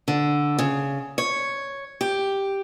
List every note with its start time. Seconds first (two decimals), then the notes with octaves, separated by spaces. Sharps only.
0.08 D3
0.59 C#3
1.18 C#5
2.01 G4